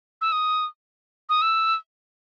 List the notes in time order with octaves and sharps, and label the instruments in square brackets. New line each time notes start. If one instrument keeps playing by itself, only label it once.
[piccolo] E6
D#6
D#6
E6